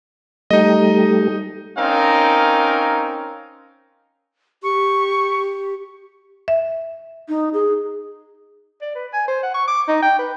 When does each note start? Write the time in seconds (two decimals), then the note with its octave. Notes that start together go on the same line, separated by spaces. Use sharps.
0.51 G3 A3 D#4 D#5
1.78 C4 C#4 D#4 A#4 F5
4.63 G4 C#6
6.48 E5
7.29 D#4
7.54 G#4
8.82 D5
8.95 B4
9.13 G#5
9.28 C5
9.43 F#5
9.54 C#6
9.67 D6
9.88 D#4
10.02 G5
10.19 B4